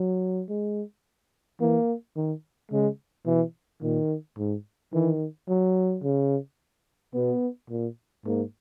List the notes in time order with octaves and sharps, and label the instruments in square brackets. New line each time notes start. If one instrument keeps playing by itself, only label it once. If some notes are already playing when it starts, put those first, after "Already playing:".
Already playing: [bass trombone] F#3
[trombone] G#3
[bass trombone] E3 [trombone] A#3
[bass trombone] D#3
[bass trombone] C#3 [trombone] G#3
[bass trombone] B2 [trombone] E3
[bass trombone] A#2 [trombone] D#3
[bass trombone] G#2
[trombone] D#3 [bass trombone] E3
[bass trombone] F#3
[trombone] C#3
[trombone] B2 [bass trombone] B3
[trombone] A#2
[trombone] G#2 [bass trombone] A#3